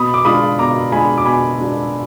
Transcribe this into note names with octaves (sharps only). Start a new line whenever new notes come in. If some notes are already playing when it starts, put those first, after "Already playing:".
Already playing: B2 B5 D#6
D6
G#3 D4 F4 B5 D#6
B2 A#5 D6
G#3 D4 F4 G#5 B5
D6
B2 G#5 B5
G#3 D4 F4